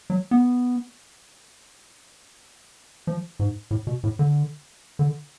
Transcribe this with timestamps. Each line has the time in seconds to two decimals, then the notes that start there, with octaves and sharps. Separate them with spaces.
0.10 F#3
0.31 B3
3.07 F3
3.39 G#2
3.71 A2
3.87 B2
4.04 A2
4.19 D3
4.99 D3